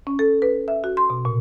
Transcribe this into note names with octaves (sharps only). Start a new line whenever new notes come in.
C#4
A4
B4
E5
F#4
C6
B2
A#2